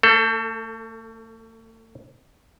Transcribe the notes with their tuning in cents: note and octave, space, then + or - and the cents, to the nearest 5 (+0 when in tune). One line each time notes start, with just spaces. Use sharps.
A3 +40 A4 +10